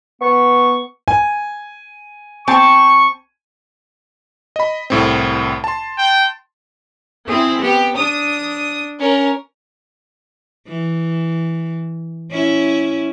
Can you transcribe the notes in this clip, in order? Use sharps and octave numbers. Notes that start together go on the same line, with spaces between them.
B3 C#6
G#5
C4 A5 C#6
D#5 B5
C2 A2 C4
A5 C6
G5
C4 E4 G#4
B3 G4
D4 D#6
C#4 A#4
E3
C#4 E4